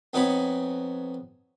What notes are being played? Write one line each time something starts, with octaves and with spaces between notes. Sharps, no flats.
F2 B3 D#4 C#5 G#5 B5